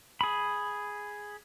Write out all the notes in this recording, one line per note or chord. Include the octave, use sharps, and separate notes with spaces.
G#4 B5